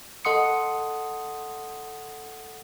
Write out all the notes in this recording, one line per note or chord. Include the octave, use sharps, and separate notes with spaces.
A4 D#5 F#5 C6 D#6 C#7